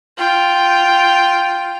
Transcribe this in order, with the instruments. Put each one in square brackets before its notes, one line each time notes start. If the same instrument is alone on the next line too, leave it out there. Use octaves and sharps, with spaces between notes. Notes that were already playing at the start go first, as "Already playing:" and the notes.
[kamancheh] F4 G5